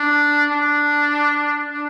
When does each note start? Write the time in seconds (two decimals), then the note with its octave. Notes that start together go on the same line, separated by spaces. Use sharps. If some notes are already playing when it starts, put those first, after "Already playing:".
Already playing: D4
0.51 D4
1.72 D4